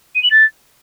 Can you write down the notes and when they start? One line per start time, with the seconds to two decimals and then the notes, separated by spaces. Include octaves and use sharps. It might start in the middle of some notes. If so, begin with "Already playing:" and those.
0.15 D#7
0.23 F#7
0.31 A6